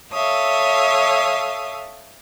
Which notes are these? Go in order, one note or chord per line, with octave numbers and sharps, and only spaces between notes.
A4 C#5 E5 F5 D#6